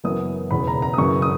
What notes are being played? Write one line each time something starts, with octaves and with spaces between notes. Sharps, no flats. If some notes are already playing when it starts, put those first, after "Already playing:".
F#1 F#2 E3 B3 D#6
E1 E2 C#3 B5
A#5
A#5
D#6
F#2 C#3 E3 C#6
D#6